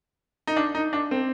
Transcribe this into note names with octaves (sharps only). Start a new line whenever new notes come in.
D#4
D4
D#4
D4
C4